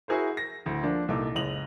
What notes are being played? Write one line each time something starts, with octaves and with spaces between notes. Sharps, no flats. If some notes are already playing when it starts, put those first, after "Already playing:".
E4 F#4 G#4 A#4 C5
A#6
D2 A2
F3 A#3 D4
C2 A#2 D#4 A4 D6
F#1 C#2 D#5 F7 F#7